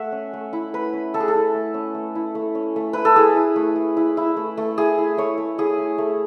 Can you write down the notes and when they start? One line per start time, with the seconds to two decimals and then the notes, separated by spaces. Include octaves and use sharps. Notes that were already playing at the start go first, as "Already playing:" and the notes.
Already playing: A3 E5 F#5
0.12 C#4
0.33 A3
0.53 E4
0.73 A3 B4
0.93 C#4
1.14 A3 A4
1.20 G#4
1.28 A4
1.35 E4
1.54 A3
1.74 C#4
1.95 A3
2.15 E4
2.35 A3
2.55 C#4
2.76 A3
2.93 E4 B4
3.05 A4
3.16 E4 G#4
3.36 E4
3.56 A3
3.76 A3
3.97 E4
4.17 E4
4.36 A3
4.57 A3
4.78 E4 G#4
4.98 E4
5.17 A3 C#5
5.38 A3
5.58 E4 G#4
5.78 E4
5.98 A3